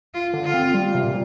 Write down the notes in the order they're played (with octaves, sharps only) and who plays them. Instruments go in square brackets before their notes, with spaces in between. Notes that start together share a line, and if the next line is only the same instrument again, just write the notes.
[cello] F4
[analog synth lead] D3
[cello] F4
[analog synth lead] C4
G3
C3
A#2